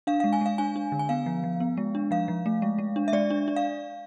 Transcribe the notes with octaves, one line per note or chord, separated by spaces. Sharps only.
D4 F5
G#3 F5
G#5
G#3 F5
D4 G#5
D4
D3
G#5
B3 F5
F3
F3
B3
G#3
D4
F3 F5
F3
A3
G#3
G#3
D4
E5
G#3 D5
D4
D4
F5